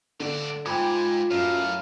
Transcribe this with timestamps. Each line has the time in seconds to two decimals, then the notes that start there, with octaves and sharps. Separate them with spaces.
0.20 A2 D3 D5
0.66 G#2 F4 G5 G#5 B5 D6
1.31 F#2 A2 F#3 F5